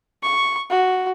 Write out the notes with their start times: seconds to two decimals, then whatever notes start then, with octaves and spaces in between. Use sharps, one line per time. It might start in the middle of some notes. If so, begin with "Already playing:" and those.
0.23 C#6
0.70 F#4